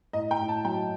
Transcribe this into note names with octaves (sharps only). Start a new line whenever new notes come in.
A2 D#5
G5
A2
A5
F#3 G5